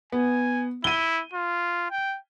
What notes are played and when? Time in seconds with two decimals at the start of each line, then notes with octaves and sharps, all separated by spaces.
0.12 B3 G#5
0.84 E4 D#7 G7
1.33 F4
1.91 G5